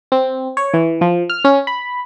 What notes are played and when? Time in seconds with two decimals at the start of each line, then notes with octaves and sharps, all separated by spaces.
0.12 C4
0.57 C#5
0.74 E3
1.01 F3
1.30 F6
1.45 C#4
1.67 B5